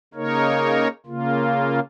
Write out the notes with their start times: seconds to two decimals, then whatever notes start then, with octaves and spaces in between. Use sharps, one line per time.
0.14 C#3 A#3 D#4 A#4 C#5
1.06 C#3 A#3 F4